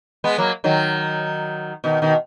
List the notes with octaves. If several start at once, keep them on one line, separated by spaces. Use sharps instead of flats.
G#3 B3
F#3 A#3
D#3 F#3
B2 D#3
B2 D#3